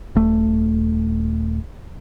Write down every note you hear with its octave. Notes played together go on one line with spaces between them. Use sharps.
D#1 A3